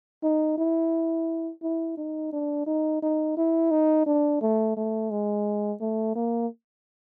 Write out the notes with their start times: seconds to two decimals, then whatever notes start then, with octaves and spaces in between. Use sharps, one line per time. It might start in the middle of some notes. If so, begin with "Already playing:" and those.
0.23 D#4
0.58 E4
1.62 E4
1.97 D#4
2.33 D4
2.67 D#4
3.02 D#4
3.37 E4
3.71 D#4
4.06 D4
4.41 A3
4.77 A3
5.11 G#3
5.81 A3
6.15 A#3